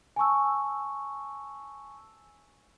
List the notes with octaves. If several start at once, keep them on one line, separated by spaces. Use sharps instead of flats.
G#5 A5 C#6 E6